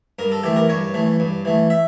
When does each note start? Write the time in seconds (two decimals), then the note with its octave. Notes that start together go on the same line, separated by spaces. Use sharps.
0.19 G2 A#4
0.32 A4
0.43 E3 A3 G4
0.56 A#4
0.69 G2 C#5
0.94 E3 A3
1.20 G2
1.45 E3 A3
1.70 E5